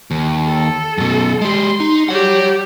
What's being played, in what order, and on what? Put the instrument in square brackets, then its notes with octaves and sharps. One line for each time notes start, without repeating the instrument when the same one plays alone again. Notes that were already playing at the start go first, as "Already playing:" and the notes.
[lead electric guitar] D#2
[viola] A4
[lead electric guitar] F#2 B2
[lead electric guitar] G#3 G4 [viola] C6
[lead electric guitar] D#4
[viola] G3 G4 [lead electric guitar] C#5 F#5